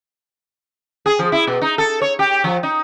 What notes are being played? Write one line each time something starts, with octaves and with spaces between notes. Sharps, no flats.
G#4
F3
E4
B2
D#4
A4
C#5
G4
F3
D#4